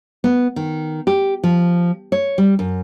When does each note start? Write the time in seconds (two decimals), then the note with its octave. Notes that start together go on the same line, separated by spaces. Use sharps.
0.24 B3
0.56 D#3
1.07 G4
1.43 F3
2.12 C#5
2.38 G3
2.59 F#2